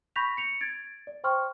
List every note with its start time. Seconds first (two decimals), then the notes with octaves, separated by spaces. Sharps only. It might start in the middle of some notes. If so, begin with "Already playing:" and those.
0.16 B5 C#6 G6 A#6 B6 F7
0.37 C#7 F7
0.61 G#6 A6 D7
1.07 D5
1.24 C5 G5 C6 C#6 F6